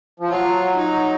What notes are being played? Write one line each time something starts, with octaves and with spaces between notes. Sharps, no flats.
F3
F#3 F4
D#4